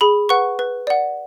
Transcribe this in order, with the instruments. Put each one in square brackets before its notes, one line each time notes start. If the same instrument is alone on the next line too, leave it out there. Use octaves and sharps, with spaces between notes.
[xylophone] G#4 B5
B4 F#5 C#6
B4
D5 F#5